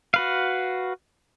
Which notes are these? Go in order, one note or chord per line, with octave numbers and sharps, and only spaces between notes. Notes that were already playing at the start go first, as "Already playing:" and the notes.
F#4 B4 F5